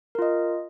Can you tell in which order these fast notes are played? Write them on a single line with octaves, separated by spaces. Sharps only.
A#4 F4 D#5